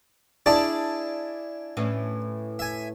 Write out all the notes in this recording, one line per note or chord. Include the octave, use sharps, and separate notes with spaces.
D4 E4 G#4 D5 A5
A2 E3 C#4
E5 G#5